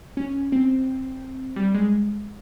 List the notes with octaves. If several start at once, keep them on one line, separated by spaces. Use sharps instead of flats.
C#4
C4
G3
G#3